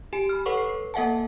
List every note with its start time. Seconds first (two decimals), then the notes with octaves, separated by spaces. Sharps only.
0.13 G4 G#5 D7
0.29 B5 F6
0.46 A4 B4 C#5 F#5 C#6
0.58 C7
0.94 A#3 A4 E5 F#5 G#5 A5